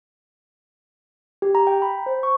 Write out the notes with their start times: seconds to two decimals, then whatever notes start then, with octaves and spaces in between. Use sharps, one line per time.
1.42 G4
1.55 A#5
1.67 G5
1.82 B5
2.06 C5
2.23 C#6